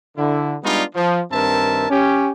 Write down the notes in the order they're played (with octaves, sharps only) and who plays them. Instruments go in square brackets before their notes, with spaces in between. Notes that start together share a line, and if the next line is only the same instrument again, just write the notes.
[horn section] D3 E4
G3 G#3 B3 D4 D#4 F4
F3
G2 D#3 C4 A#4 E5 A5
C#4 G4